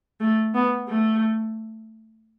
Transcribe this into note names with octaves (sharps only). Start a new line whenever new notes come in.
A3
B3
A3